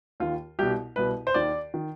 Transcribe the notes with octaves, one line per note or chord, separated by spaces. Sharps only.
D#2 D#3 F4
C2 B2 G4
C2 B2 B4
C5
D#2 D#3 D5
D#3